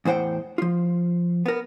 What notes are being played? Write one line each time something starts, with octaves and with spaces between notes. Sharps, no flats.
E2 A2 C5 F#5 G5
F3 F4
B3 A#4